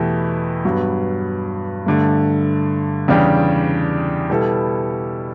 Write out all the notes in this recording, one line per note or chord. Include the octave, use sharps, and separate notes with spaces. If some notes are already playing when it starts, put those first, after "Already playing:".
Already playing: E2 B2 A3 E4 G4
G2 F#3 B3 F#4
G2 D3 A3
E2 C#3 G3 D4 G4
B2 G3 B3 E4 A4